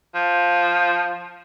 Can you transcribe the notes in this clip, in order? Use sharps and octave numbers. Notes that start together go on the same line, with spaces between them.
F3